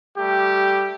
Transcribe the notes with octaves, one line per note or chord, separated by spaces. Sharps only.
G3 A3 G4